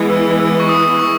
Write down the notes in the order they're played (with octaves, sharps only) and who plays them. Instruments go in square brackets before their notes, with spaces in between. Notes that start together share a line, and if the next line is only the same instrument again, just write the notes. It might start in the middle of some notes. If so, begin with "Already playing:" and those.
Already playing: [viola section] E3 G#3 B3
[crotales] E6
E6
C#6
D#6
C#6